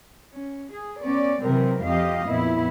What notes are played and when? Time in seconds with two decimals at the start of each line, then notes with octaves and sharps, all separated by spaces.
0.32 C#4
0.71 G#4
1.02 B3 C#4 D5
1.43 C3 E3 F#3 G#3 C4 A#4
1.85 F2 F3 G4 D#5 F5
2.28 F2 A#2 B3 E4